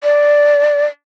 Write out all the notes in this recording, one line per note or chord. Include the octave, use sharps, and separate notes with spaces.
D5